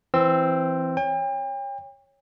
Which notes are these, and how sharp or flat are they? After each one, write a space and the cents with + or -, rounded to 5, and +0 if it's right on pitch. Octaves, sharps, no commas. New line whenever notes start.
E3 +10 C4 +0 E6 +15
C#5 +0 G5 +40